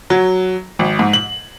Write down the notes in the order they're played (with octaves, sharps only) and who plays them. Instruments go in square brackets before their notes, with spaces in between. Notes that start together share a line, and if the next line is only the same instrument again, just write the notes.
[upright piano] F#3
G#1
G#2
F#7